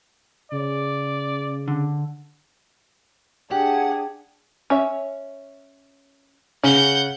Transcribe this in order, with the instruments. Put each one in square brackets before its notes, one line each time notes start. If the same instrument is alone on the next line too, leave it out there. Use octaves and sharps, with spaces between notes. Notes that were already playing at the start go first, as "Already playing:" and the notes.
[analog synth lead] C#3 [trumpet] D5
[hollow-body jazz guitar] D3
[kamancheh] D4 G#4 [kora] G4 [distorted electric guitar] F#5
[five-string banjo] C#4 C#5 E5
[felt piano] C#3 [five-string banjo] C#4 [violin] F#5 G6